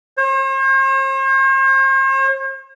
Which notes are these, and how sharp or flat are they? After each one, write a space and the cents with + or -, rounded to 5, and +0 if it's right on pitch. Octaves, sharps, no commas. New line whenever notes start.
C5 +45